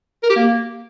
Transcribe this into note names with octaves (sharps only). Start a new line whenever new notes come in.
A#4
G4
A#3